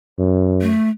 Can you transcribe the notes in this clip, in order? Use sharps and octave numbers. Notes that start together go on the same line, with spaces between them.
F#2
A3